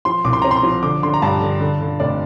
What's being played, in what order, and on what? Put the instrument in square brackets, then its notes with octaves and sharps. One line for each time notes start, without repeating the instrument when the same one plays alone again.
[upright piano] F3 C6
C2 D6
C6
C4 A#5
C6
F3
D3 D6
D3 C6
A#5
G2 A5
D3
D3
D3
F1 D5